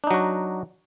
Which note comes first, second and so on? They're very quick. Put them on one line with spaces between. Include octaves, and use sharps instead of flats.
D4 D#4 F#3 F#4